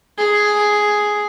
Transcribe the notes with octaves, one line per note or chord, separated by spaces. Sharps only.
G#4